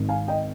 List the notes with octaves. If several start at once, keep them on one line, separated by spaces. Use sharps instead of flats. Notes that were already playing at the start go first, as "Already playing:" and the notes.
Already playing: G#1 G#2 D#3
F5 G#5
D#5 G5